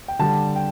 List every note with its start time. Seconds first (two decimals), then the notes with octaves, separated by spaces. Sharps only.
0.08 G5
0.19 D3 G3 A5
0.56 G5